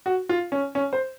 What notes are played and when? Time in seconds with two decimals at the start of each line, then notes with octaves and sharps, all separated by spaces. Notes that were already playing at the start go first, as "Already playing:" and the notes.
0.06 F#4
0.29 F4
0.52 C#4
0.75 C#4
0.93 C5